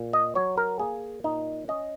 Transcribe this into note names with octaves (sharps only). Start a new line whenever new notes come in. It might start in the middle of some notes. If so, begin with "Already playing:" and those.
Already playing: A#2
D#5
F#3 C#5
A#4
A#3 G#4
A#2 D#4
C#4 D#5